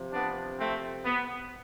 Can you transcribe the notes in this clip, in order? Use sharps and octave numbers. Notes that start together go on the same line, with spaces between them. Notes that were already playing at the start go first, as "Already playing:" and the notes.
Already playing: C3 F3
B3 D4
A3 C4
B3